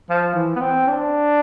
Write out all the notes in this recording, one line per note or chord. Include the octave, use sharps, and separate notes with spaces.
F3
E3
B3
C4
D4